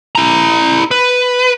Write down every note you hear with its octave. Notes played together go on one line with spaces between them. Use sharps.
E4 A#5
B4